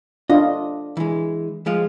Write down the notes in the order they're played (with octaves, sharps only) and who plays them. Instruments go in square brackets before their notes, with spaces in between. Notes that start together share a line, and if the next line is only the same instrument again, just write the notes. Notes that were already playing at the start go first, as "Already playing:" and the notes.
[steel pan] D4 F4 [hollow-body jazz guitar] D#5
[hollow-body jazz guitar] E3 G#3
F3 G#3 F4